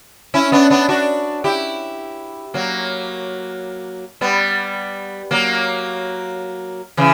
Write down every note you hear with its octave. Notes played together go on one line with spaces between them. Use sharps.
C#4 E4
B3 D4
B3 D4
D4 F#4
E4 G4
F#3 A#3
G3 B3
F#3 A#3
C#3 E3